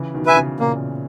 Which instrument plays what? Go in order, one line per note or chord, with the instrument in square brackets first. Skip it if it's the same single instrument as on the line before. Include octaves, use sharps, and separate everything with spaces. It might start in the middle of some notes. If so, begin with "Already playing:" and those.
Already playing: [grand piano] C#3 E3
B2 D#3
[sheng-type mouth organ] B4 E5 G#5
[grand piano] C#3 E3
[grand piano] A#2 C#3 [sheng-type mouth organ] A#3